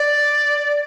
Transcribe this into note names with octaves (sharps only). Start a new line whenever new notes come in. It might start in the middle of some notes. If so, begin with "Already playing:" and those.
Already playing: D5